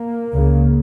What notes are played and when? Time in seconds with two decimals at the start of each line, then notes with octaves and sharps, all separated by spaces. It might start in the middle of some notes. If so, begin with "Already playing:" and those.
Already playing: A#3
0.34 C#2 C#3